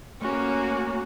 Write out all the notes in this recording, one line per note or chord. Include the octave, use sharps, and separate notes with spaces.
A3 A#3 C#4 F#4